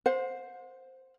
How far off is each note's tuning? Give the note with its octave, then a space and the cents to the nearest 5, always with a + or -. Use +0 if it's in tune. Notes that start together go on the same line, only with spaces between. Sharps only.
C5 +0 F#5 -40